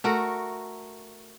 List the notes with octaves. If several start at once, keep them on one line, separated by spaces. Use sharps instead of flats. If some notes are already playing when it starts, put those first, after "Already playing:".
A3 F#4 A#4